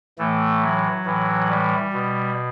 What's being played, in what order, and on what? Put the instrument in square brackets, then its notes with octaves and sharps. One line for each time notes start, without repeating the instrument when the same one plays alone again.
[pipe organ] A2 E3 A3
F#3
A2 E3
G3
B2